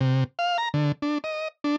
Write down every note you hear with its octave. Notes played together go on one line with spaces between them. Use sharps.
C3
F5
A#5
D3
D4
D#5
D4